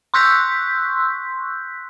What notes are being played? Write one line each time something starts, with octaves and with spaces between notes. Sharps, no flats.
C6 C#6 E6 F#6 G6 B6